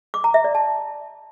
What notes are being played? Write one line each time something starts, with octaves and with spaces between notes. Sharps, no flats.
D6
A#5
E5
D5
A5